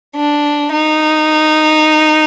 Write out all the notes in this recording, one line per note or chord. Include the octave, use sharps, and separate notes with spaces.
D4
D#4